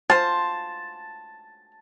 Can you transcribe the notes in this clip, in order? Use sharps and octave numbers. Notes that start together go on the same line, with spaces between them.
F4 C5 A5